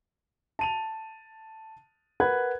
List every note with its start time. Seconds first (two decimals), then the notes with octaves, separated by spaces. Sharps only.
0.59 A5 D#7 F7
2.20 A#4 B4 F#5 B5 F#6 G#6